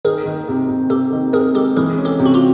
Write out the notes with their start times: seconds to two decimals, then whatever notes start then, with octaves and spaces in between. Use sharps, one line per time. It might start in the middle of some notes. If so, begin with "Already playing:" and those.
0.05 D#3 G#4 A#4
0.26 D#3
0.48 C3
0.69 C3
0.90 C3 G4 A4
1.12 D#3
1.33 C3 G#4 A#4
1.55 G#3 G4 A4
1.77 E3 G#4 A#4
1.98 C#4
2.05 G4 A4
2.19 C3
2.26 F#4
2.34 F4 G4